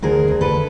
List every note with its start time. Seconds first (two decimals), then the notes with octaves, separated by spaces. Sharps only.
0.02 D2 G#4 A#4
0.28 D2
0.41 A4 B4